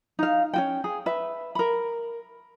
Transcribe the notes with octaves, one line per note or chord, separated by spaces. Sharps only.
D#4 F5
C#4 F#4 G5
G#4
B4 E5
A#4 B5